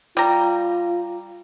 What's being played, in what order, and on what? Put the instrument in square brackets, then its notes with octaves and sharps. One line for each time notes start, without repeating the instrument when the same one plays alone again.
[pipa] G3 A#5 [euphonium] F4